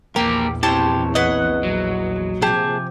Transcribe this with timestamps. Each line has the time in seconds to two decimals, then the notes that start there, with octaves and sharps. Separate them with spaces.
0.16 A#1 E2 F3 A#3 G4 A#4 A#5
0.63 C4 E4 G4 C5 C#5 A5
1.15 B4 C#5 D#5 F#5
1.63 F#3
2.42 C3 F3 A#3 G4 G#4 G#5 A5